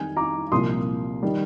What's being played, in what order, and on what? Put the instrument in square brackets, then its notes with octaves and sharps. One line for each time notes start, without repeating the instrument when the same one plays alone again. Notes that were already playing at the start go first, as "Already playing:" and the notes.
Already playing: [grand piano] F2 D#3 G3 G#5
A#5 D6
C2 A#2 F3 C6 D#6
D#3 G3